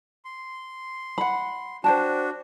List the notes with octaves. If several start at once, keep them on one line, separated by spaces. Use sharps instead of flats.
C6
F#5 B5
D4 F#4 C5 G5 A5